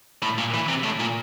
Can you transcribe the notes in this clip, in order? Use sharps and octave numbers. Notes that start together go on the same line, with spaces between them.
A2
A#2
E3
C3
A2
A#2